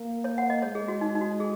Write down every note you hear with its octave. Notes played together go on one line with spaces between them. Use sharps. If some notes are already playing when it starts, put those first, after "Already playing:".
Already playing: A#3
C#5
F#5
D#5
G#3 C#5
G#4
F#4
D#4
D#4
F#4
G#4